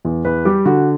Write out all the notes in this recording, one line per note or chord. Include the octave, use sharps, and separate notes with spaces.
E2
E2 B4
G3 G4
D3 F#4